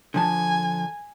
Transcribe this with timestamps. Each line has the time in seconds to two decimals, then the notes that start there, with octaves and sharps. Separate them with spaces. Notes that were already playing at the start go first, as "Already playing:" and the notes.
0.14 D3 F3 G#5 A5